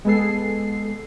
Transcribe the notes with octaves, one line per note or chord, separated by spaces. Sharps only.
G#3 B3 G#4 A4 C7